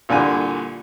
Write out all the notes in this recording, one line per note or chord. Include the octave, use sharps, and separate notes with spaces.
C2 A#2 D3 G#5